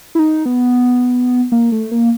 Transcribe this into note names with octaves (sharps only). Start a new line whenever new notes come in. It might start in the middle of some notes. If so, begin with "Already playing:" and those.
E4
D#4
B3
A#3
A3
A#3